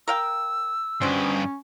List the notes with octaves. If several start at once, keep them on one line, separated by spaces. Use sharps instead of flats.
A#4 F5 G5 E6
G2 B2 B3 C#4 C5